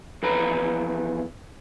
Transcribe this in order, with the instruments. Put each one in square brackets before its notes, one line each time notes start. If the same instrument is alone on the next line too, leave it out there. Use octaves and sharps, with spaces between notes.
[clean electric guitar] E2 F3 B4 A#5 B5